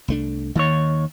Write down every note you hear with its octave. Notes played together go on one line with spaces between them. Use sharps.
C2 A3 D4
D#2 D#3 C#5